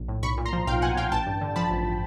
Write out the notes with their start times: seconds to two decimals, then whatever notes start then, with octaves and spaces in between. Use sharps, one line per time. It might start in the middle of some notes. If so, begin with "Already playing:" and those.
Already playing: A#1
0.08 A2
0.23 B1 B5 C#6
0.38 A#2
0.46 A#5 C6
0.53 F3
0.67 B1 F5 G5
0.82 B1 F#5 G#5
0.97 A#2 F5 G5
1.12 A1 G5 A5
1.27 G2
1.41 D3
1.56 F3 A5 B5
1.71 A1